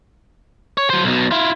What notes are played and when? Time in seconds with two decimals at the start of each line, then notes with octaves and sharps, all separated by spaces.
0.78 C#5
0.90 F#3 C5
1.04 B1 B2
1.31 E4 F4